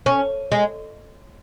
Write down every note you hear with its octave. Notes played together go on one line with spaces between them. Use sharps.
C#4
G#3